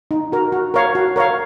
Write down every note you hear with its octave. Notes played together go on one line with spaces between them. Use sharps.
D#4
F#4 A#4
F#4
A#4 C#5 F5
F#4
A#4 C#5 F5